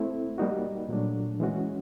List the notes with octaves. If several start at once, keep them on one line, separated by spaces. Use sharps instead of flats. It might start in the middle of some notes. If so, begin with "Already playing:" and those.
Already playing: A3 C4 E4
G3 A#3 D#4 F#4
A#2 F#3 A3 D4
E3 G#3 C#4 F#4